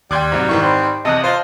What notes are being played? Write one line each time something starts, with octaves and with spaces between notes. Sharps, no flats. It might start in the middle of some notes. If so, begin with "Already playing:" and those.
D#2 G3 G5 C6 D6 F#6 G#6
G#2 C3 F#3
G#2 D#3 E3 C#6
C4 B4 C6
E2 C3 D#5 A5 D#6 F#6
F4 C5 D#5